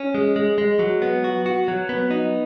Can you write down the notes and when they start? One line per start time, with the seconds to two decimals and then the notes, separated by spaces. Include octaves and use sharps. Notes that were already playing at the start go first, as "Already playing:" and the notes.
Already playing: C#4
0.15 G#3
0.36 G#3
0.58 G#3
0.79 F#3
1.02 B3
1.24 F#4
1.46 F#4
1.68 F#3
1.89 B3
2.11 D#4